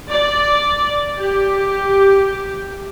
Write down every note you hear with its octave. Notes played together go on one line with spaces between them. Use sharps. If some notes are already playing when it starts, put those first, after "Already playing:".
D5
G4